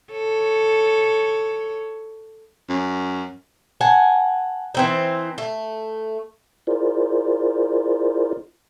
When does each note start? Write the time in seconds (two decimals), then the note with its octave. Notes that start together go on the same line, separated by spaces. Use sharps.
0.12 A4 C#5
2.69 F#2
3.81 F#5 G#5 A5
4.75 E3 C4 D#4
5.38 A3
6.67 E4 F4 G#4 A#4 C5 D5